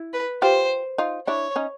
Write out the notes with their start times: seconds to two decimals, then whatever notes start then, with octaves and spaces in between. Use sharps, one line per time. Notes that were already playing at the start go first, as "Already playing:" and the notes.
Already playing: E4
0.13 B4
0.42 F4 G4 C5
0.98 D#4 F4
1.27 D4 E4 C#5
1.56 C#4 D#4